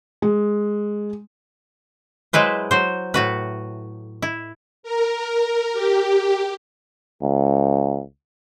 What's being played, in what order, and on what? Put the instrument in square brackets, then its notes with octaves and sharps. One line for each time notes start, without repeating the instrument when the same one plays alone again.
[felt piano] G#3
[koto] F#3 G#3 E4 B4 C5
F#3 C5
A2 F#4 B4
E4
[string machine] A#4
G4
[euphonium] C#2